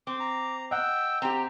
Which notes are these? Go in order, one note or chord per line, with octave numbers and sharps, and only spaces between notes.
C4 D6
A#5
D#5 F#5 G5 E6
C4 G4 A#5